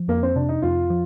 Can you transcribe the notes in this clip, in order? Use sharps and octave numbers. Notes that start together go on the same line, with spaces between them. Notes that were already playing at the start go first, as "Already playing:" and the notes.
Already playing: F3
F2 A#3
C4
C3 D4
D#4
F2 F4
F3